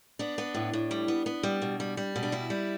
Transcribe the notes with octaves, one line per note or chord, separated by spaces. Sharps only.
B3 D4
B3
A2
A2
G3
B3
B3
G3
B2
G3
G3
B2
D4
G3 E4
G3